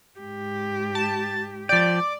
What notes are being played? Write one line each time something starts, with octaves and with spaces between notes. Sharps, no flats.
G#2 G4
A5
F3 D5 G5